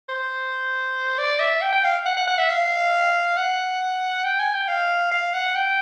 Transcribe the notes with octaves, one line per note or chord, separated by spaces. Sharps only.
C5
D5
E5
G5
G5
F5
F#5
F#5
F#5
E5
F5
F#5
G5
G#5
G5
F5
F5
F#5
G5